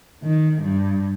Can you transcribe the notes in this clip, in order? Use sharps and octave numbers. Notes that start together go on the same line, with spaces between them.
D#3
G2